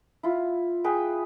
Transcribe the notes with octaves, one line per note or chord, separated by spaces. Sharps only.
E4 F4
G#4 B4 G5